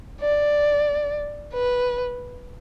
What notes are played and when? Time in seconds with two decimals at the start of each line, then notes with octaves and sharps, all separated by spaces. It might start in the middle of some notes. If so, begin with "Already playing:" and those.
0.21 D5
1.54 B4